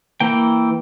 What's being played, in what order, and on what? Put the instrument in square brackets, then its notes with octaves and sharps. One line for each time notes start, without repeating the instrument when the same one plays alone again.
[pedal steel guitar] E3 A#3 G5